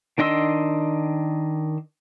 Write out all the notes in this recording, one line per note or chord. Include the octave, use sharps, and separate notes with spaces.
D#3 D4 D#5 C6 E6